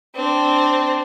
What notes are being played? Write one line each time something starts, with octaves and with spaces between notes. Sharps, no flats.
C4 D4